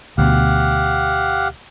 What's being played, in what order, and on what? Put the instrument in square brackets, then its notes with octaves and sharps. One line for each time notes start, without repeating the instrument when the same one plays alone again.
[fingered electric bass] D2 B2 [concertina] G4 F5 F#5